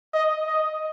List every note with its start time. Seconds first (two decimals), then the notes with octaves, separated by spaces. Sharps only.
0.14 D#5
0.47 D#5